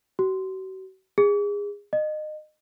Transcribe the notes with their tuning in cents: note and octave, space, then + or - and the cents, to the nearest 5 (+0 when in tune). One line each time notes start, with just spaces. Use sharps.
F#4 +40
G#4 -25
D#5 -25